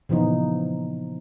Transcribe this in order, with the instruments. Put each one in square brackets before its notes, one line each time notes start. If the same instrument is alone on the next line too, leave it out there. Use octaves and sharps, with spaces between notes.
[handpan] A#2 C#3 E3 F3 B3 D#4